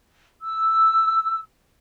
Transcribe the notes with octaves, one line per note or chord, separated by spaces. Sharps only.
E6